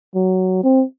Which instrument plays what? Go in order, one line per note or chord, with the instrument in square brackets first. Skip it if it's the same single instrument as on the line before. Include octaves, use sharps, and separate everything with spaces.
[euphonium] F#3
C4